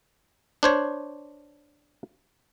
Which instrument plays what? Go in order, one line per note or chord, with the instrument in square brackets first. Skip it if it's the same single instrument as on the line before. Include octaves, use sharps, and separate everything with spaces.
[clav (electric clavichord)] D4 C5 C#5